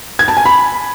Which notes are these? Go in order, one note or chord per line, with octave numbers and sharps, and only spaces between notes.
G#6
A5
G#5
B5